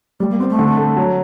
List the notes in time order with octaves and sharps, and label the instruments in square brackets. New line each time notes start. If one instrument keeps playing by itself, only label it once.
[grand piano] G3 [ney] A3
[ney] A#3
[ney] B3 [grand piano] C4
[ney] A3
[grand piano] D3
A3
F#3